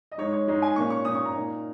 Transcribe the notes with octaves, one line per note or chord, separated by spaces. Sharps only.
D#5
G#2 G#3 D#4 C#5
C#5
G#2 G#3 D#4
G#5
A#2 A#3 C#4 C#6
C#6
A#2 A#3 C#4 D#6
C#6
A#5
A#2 A#3 D#4